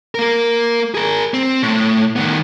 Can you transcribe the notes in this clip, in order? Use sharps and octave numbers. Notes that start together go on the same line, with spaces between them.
A#3 A#4
G#4 A#4
C4
A2
D#3 B3